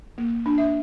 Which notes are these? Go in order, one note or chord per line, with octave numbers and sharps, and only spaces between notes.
A#3
D4
E5